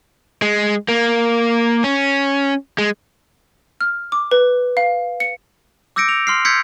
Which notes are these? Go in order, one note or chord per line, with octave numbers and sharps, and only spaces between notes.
G#3
A#3
C#4
G#3
F6
D6
B4
F5
C#7
D6 E6 G6 A#6 C#7 D7
F7
C6 F6 C7
C6 E6 G6 G#6 B6 C#7